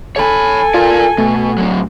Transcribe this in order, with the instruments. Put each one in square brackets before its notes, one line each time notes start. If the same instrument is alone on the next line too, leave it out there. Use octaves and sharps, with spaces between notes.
[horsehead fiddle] A4 G#5 [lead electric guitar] C#5 B5
[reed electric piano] F4 [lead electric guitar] A#4 D5
[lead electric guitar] B2 [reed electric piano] A3
[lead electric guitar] A2 F#3